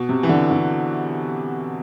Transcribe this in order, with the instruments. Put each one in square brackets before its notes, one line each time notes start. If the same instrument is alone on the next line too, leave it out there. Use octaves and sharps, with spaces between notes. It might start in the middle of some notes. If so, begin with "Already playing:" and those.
Already playing: [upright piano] B2
C3
E3
D3
D3